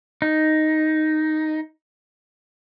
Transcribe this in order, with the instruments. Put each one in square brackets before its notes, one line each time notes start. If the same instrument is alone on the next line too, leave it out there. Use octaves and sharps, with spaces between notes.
[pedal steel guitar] D#4